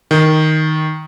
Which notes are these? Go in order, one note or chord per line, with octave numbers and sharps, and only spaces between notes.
D#3